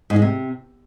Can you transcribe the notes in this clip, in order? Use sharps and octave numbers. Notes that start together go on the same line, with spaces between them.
G#2
G#3
C3